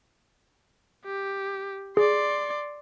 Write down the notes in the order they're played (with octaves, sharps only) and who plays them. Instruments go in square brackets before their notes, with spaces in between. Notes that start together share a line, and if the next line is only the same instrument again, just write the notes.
[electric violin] G4
[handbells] G#4 [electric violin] D5 C6